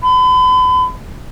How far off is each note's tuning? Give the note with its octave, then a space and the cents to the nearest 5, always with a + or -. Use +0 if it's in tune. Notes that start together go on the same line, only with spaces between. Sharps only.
B5 +40